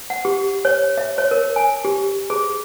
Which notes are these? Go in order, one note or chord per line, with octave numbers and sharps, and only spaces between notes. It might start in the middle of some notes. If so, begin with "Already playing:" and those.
F#5
G4
C#5
E5
C#5
A#4
G#5
G4
G#4